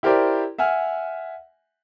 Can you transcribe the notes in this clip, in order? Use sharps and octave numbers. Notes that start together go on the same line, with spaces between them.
E4 G4 A#4 C5 D5
E5 F#5 G#5 F6